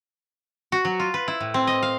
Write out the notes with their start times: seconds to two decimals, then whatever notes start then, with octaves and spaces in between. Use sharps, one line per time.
0.72 F#4
0.85 F#3
1.00 F4
1.14 B4
1.28 E4
1.40 A2
1.54 C4
1.67 D#5
1.83 F5